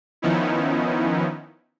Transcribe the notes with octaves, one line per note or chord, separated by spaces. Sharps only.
D#3 F3 B3 C#4 D#4 E4